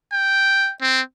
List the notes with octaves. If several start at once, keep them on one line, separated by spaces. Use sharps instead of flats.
G5
C4